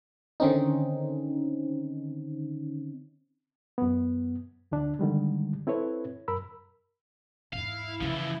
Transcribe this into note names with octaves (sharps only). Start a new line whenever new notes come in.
D3 D#3 C4 C#4 D#4
F#2 B3
D2 D3 D4
D3 D#3 G3 G#3
C4 E4 A4 B4 C#5
F#2 A#4 B5 E6
E2 G#2 E4 F5
C#3 E3 F3 C#4